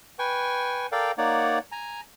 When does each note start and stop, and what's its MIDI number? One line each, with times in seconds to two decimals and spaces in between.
0.19 0.87 71
0.19 0.87 79
0.19 0.87 80
0.19 0.87 85
0.92 1.12 69
0.92 1.12 70
0.92 1.12 74
0.92 1.12 77
0.92 1.12 79
1.18 1.59 58
1.18 1.59 63
1.18 1.59 73
1.18 1.59 74
1.18 1.59 78
1.72 2.01 80
1.72 2.01 82